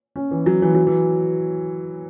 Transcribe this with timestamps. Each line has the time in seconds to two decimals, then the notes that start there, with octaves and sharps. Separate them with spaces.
0.16 C#4
0.31 E3
0.46 F#3
0.62 E3
0.75 F#3
0.87 E3